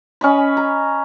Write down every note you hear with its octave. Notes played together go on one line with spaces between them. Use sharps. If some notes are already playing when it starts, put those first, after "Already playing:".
C#4 D#5 B5
A#5